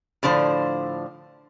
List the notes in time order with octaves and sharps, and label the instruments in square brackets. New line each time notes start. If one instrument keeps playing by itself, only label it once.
[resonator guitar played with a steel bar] A2 D3 F3 C5